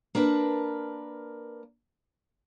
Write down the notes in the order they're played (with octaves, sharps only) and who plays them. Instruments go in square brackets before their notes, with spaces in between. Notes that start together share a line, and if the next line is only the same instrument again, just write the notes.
[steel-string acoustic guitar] A#3 D4 A#4 B4 A5